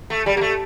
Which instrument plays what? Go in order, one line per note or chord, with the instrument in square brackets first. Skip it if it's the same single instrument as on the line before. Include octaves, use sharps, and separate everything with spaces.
[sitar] A3
G3
A#3
A3